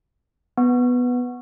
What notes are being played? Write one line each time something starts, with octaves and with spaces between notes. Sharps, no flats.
B3